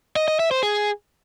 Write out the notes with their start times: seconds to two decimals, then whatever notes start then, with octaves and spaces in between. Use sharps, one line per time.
0.16 D#5
0.28 D#5
0.39 E5
0.51 C5
0.63 G#4